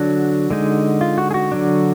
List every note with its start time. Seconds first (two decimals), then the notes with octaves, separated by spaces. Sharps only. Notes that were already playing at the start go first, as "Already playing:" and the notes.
Already playing: D3 F#3 D4 F#4
0.51 D3 G#3 D#4
1.01 F4
1.18 F#4
1.31 G#4
1.34 F#4
1.52 D3 F#3 D4